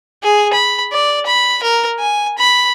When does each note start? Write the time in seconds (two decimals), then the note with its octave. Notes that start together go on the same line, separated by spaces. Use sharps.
0.23 G#4
0.53 B5
0.92 D5
1.26 B5
1.63 A#4
2.00 G#5
2.38 B5